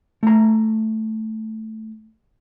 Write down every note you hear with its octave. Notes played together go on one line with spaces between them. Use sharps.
A3 A#5